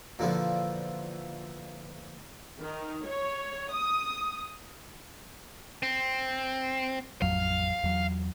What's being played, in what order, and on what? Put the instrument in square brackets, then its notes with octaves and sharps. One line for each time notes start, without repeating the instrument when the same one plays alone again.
[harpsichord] A#2 D3 E3 F3
[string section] D#3
C#5
D#6
[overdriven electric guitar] C4
[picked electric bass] A1 F2 F#3 [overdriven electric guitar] F5
[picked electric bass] E2 F#3